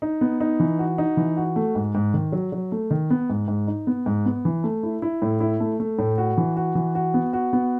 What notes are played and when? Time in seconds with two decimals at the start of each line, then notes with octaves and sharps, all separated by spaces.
0.02 D#4
0.21 B3
0.40 D#4
0.60 E3
0.79 F#4
0.98 D#4
1.17 E3
1.37 F#4
1.56 A3
1.75 G#2
1.95 G#2
2.14 D#3
2.32 F#3
2.52 F#3
2.72 A3
2.91 D#3
3.10 B3
3.30 G#2
3.48 G#2
3.67 D#4
3.87 B3
4.06 G#2
4.26 B3
4.45 E3
4.64 A3
4.83 E4
5.02 E4
5.22 A2
5.40 E4
5.60 A3
5.80 A3
5.99 A2
6.18 F#4
6.37 E3
6.57 F#4
6.75 E3
6.95 F#4
7.14 B3
7.33 F#4
7.53 B3